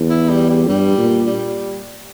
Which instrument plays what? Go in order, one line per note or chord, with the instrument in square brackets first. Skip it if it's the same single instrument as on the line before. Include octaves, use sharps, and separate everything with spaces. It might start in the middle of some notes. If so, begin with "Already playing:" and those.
Already playing: [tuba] E2
[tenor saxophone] E4
G3
G3
[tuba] G2 [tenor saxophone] G3
[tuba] A#2
[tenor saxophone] G3